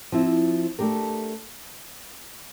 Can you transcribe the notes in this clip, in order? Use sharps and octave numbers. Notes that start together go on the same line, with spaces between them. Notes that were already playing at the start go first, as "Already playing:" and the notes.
F3 C4 E4
A3 D4 G4 A#4